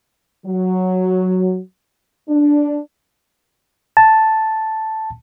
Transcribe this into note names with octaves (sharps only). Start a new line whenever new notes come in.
F#3
D4
A5